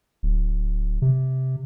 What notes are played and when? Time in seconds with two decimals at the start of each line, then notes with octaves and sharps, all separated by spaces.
0.23 D1
1.02 C3